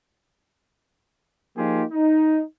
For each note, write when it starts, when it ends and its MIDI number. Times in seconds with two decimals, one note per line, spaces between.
1.57 1.83 53
1.57 1.83 58
1.57 1.83 63
1.57 1.83 65
1.57 1.83 67
1.57 1.83 68
1.92 2.43 63